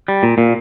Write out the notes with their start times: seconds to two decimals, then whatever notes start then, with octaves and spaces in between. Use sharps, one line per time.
0.08 G3
0.23 A#2
0.38 A#2